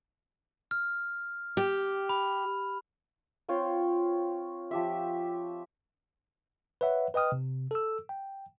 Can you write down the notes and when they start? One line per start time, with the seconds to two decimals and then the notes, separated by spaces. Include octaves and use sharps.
0.71 F6
1.57 G4
2.09 B5
3.49 C4 F4 C#5 G5
4.71 F3 G4 E5
6.81 B4 C#5 E5 F#5
7.14 B4 D#5 G5 D#6 F6
7.32 C3
7.71 A4 E6
8.09 G5